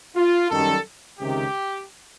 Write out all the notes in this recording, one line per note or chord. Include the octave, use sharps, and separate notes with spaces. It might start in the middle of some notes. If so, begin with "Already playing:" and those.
F4
F#2 D#3 G3 A4
C#2 C3 D#3 G4